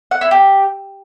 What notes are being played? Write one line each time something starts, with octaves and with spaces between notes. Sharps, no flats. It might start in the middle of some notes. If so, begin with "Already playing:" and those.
F#5
E4
G4